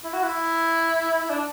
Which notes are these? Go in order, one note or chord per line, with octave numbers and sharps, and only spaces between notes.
E4
F#4
E4
D4